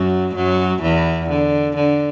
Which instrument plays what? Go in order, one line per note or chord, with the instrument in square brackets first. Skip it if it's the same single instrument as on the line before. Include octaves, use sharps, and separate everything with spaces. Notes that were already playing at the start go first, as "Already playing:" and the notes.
Already playing: [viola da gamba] F#2 F#3
F#2 F#3
E2 E3
D3
D3